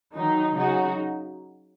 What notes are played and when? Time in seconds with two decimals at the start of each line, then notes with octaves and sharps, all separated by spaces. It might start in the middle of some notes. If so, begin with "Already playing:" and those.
0.14 D#3 F#3 D#4
0.53 C#3 F#3 D#4 F#4